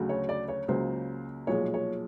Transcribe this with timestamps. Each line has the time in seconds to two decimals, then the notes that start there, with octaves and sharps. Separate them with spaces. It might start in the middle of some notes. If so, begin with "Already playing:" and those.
Already playing: D2 C#3 F#3
0.09 C#5
0.29 D5
0.48 C#5
0.68 C#2 C#3 F#3 A#3 C5
1.47 B1 A#2 F3 G#3 C#5
1.74 C#5